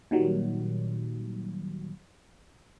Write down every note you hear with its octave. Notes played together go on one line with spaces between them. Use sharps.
A#2 D#3 F#3 G3